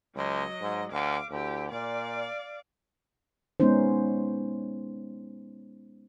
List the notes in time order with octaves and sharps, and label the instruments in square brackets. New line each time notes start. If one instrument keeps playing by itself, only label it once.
[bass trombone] C#2 [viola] F#3 D#5
[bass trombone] G#2
[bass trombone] D2 [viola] F5 D6
[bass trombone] D2 [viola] E4 G4
[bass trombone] A#2 [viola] D5 F5
[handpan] G#3 B3 C#4 D#4 C5